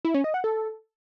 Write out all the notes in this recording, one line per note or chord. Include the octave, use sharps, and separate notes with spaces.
E4
C#4
D#5
F#5
A4